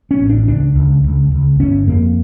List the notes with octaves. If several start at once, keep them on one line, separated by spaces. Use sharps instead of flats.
C#4
A1
D4
C#2 D4
C#2
C#2
C#2
G1 C#4
F2 A#3